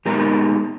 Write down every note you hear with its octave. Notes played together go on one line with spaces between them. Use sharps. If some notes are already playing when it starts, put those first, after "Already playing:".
A#2 G#3 B3 D#4 G4 A#4